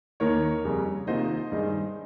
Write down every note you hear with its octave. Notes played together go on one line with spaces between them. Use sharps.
D#2 D#3 A#3 A#4 C#5
F2 C#3 G3 C#4
C3 D#3 A#3 F4 C5 D#5
G2 D#3 G#3 D#4